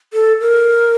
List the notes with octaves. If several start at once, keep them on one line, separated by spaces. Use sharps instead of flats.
A4
A#4